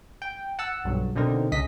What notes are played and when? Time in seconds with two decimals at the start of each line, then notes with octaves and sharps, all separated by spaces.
0.22 G5
0.59 F#5 A5 E6
0.84 B1 G2 F#3
1.16 B2 D3 C4 D#4 A#4
1.52 C#2 G#3 D#5 B6